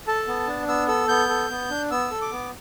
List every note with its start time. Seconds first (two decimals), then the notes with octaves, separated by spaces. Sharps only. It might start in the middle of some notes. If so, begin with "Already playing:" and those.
0.07 A4 A5
0.27 B3
0.47 D4
0.68 B3 E6
0.88 A4 E6
1.09 B3 G6
1.29 A4
1.50 B3
1.70 D4
1.90 B3 E6
2.11 A4
2.21 D6
2.32 B3